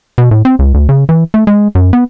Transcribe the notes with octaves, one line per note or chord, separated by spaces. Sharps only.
B2
A2
C4
C#2
D2
C#3
E3
A3
G#3
F#2
B3